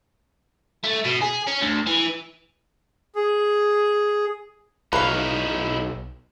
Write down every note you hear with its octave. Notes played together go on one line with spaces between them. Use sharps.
A3
B2
G#4
C#4
D2
E3
G#4
B1 D#4 E4 B4 C#5 F5